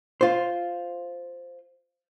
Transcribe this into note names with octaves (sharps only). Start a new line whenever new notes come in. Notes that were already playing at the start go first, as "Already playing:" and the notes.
F4 C5